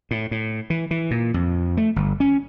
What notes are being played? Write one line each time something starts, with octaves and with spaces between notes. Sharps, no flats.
A2
A2
E3
E3
A#2
F2
A3
G1
C#4